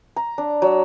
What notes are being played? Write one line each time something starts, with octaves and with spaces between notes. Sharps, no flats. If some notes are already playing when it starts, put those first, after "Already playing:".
A#5
D4
F#3